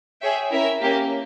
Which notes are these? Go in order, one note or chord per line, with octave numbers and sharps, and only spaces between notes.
G#4 C#5 E5 G5
C#4 E4 A#4 E5
A#3 C#4 G4